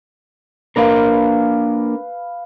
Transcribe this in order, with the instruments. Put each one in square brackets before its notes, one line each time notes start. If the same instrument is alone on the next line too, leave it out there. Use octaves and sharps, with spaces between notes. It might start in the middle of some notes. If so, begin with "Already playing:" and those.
[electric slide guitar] A#3 D4 A#4 [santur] B4 F5